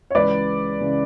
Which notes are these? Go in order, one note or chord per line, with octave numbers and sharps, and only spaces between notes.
C#5
C#2 C#3 E3 B4 D5
C#3 E3